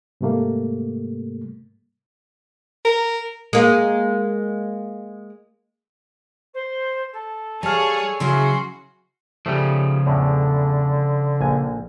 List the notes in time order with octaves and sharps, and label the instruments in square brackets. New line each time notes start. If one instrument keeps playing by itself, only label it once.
[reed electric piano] G#2 C3 G3 A3 A#3
[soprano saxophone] A#4
[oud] G#3 A#3
[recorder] C5
A4
[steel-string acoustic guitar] G3 [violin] G#4 C#5 [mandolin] F5 A5
[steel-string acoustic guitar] C#3 F#3 G#4 [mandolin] C#4 D#4 E4 [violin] F#4 C6
[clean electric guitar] C#3 F3 [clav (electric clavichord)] G3 A3
[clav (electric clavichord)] E2 A2 [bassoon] D3
[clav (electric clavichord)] A#1 G#5